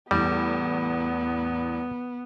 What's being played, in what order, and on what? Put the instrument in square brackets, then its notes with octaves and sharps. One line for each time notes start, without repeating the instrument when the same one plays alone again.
[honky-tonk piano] E2 A2 [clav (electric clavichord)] G3 [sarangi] B3